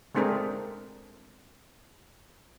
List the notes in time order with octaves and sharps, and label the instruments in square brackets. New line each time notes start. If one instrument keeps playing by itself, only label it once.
[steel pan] G#3 A3 C4 D4 G#4 A#4